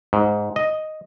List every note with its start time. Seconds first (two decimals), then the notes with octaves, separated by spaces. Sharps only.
0.13 G#2
0.56 D#5